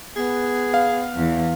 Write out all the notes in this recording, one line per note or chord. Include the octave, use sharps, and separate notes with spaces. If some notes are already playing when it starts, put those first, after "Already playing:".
B3 G#4
F5
E2